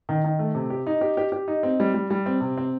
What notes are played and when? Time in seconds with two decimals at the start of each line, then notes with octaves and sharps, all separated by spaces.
0.09 D#3
0.24 D#3
0.39 A3
0.55 C3
0.70 G4
0.87 D#4
1.01 G4
1.17 G4
1.32 G4
1.48 D#4
1.63 C4
1.80 G3
1.94 G3
2.10 G3
2.26 C4
2.41 C3
2.57 C4